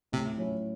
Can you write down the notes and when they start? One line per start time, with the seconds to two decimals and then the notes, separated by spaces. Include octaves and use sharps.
0.12 A2 C3
0.38 F#3 C#4 E4